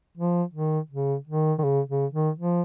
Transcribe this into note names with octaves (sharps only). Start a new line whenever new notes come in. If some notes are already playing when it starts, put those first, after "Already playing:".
F3
D#3
C#3
D#3
D#3
C#3
C#3
D#3
F3